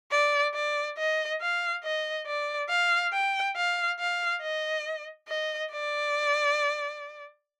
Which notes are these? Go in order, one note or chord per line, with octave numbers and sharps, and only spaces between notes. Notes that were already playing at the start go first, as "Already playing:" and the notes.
D5
D5
D#5
F5
D#5
D5
F5
G5
F5
F5
D#5
D#5
D5